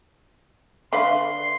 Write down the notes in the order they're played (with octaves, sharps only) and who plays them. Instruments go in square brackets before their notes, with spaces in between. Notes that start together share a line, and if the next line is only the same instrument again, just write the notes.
[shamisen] D3 B4 F5 [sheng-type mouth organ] C6